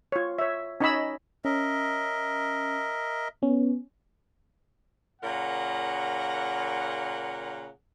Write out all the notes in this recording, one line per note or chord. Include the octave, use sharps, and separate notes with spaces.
F4 C#5
C#5 E5
C#4 D#4 C#5 D#5 B5 E6
C#4 A#4 D#5 E5
B3 C#4
A#2 C#3 A#4 F#5